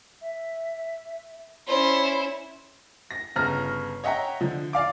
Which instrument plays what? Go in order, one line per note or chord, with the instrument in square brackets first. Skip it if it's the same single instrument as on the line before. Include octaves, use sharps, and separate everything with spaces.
[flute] E5
[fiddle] C#4 E4 [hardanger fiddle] C5 [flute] D5
[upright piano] A#6
G1 C#3 A#5 F6 A#6
C#5 D#5 E5 F#5 G5 A#5
D3 F3
D5 F5 D6